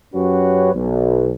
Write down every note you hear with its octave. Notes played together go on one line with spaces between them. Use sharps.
F#2 C#4 F#4 G4 B4 C#5
B1